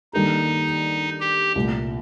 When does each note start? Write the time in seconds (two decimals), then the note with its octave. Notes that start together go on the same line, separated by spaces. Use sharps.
0.13 D#3 G3 A#3 D4 D#4 A4
1.20 G4
1.55 C2 A#2 A3